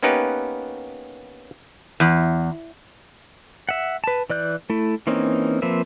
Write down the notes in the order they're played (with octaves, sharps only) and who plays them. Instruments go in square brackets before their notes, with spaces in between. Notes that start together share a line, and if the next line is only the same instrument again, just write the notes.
[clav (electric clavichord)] A#3 B3 C#4 D#4 G4 B4
[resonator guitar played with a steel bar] E2
[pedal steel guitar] E5 F#5
B4 A5
E3 D5 F#6 G6
A3 E4
E3 A#3 C4 C#4 D#4
F3 A#3 C4 B4 E5